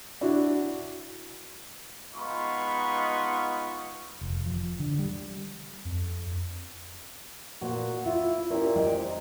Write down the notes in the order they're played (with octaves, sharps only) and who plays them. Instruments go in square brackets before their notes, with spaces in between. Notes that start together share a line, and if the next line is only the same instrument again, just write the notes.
[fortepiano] D4 E4 F#4
[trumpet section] G#3 B3 D#4 F4 B5 C#6
[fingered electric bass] F1
F3
D3
G3
[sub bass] F2
[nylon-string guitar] A#2 A#3 [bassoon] F#4
[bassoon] E4 [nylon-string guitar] F4
[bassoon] A#2 [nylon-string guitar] C#4 E4 G4
[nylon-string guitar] G3 G#3 G5
[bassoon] C3 [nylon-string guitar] D#4